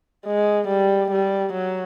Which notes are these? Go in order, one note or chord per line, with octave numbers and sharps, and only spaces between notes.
G#3
G3
G3
F#3